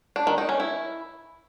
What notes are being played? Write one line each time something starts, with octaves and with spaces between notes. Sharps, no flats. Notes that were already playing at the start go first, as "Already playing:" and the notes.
D4
D#3
D#4
C#4
E4